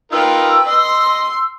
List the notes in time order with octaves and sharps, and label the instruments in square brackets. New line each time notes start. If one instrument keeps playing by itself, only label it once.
[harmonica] D#4 F4 A#4 [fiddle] B4 G5 [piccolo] E6
[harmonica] D#5 [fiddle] C6